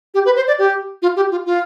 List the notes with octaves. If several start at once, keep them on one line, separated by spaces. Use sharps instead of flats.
G4
B4
C5
D5
G4
F4
G4
F4
F4